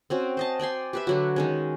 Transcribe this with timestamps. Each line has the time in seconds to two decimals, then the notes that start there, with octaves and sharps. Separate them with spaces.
0.10 C4 C#4 F#4
0.37 C5 D#5 A5
0.59 D5 G5 G#5 C6
0.93 G4 B4 E5
1.07 D3 F#3 F#4
1.36 D#3 G#3 C#4